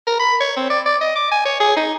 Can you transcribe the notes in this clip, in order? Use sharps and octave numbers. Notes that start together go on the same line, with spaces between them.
A#4
B5
C#5
C4
D5
D5
D#5
D6
G#5
C#5
G#4
D#4